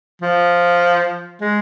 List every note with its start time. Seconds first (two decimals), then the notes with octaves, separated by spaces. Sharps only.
0.22 F3
1.41 G#3